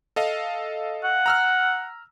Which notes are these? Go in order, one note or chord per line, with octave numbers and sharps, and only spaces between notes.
A4 D#5 F5
F#5
A#5 E6 F6